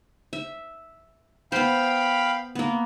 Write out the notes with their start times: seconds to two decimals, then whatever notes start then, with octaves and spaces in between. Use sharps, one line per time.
0.33 E5
1.52 B3 C5 F5 G5 B5
2.55 A#3 B3